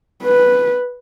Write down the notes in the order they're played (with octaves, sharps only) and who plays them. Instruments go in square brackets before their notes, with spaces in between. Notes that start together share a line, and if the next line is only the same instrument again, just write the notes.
[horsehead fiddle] B4